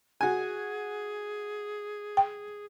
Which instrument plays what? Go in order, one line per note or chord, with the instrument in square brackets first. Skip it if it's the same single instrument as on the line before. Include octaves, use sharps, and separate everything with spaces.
[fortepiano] F#4 G#5 [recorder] G#4
[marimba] G5